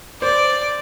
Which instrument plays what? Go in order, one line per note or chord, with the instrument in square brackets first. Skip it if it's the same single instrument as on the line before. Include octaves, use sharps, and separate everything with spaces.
[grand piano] C5 [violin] D5